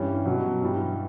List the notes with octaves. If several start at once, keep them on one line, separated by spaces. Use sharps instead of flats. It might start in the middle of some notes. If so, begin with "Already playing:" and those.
Already playing: G2 E3 G3 C#4
B2 F#3
G2 E3 G3